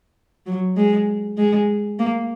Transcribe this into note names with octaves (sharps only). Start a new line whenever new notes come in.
F#3
G#3
G#3
A#3